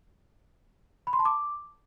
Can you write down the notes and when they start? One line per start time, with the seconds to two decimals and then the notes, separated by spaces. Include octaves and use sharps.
1.07 B5
1.13 C6
1.19 A5
1.25 D6